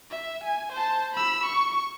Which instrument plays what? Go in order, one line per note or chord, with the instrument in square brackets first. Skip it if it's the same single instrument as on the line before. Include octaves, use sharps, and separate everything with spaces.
[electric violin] E5
G#5
C5 A5
B5 E6
C#6